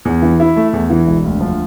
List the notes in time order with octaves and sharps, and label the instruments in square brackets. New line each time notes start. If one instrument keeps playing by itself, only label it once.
[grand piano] E2
E3
E4
A3
E2
E3
E1
D2
F3